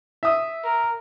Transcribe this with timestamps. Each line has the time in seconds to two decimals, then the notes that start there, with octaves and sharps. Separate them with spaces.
0.23 E5 D#6
0.64 A#4